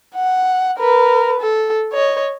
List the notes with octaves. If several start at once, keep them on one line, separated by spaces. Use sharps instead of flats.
F#5
A#4 B4
A4
C#5 D#5